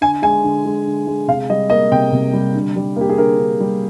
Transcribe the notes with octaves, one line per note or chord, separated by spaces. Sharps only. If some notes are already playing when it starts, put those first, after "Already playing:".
D3 G#5
G#3 G#5
D3
G#3
D3
G#3
C3 F5
G3 D#5
A#3 D#5
C3 G5
C3
G3
D3
G3
A#3 G4
G#4
D3 A#4
D3
G3